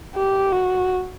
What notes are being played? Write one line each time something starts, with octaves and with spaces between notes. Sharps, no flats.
G4
F#4